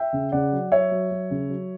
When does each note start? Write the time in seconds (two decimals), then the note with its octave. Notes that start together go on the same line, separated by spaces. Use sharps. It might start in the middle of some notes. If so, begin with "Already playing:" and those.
Already playing: E5 G5
0.13 C#3
0.32 C#3 D5 F#5
0.52 F#3
0.72 F#3 C#5 E5
0.91 F#3
1.11 F#3
1.31 C#3
1.49 F#3